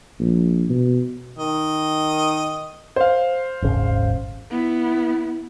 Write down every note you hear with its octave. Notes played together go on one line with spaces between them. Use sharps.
A#1
B2
D#3 D#5
C5 F5
D#1 G#1 C#3
B3 E4